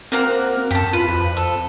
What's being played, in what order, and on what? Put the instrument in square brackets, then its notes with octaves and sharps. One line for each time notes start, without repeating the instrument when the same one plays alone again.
[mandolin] A#3 F#4 A#4 [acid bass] C4
[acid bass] F#2 [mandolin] G4 A4
[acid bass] F4 [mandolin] B4
[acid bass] F2
[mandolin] A4